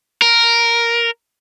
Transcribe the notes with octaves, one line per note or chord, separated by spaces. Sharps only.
A#4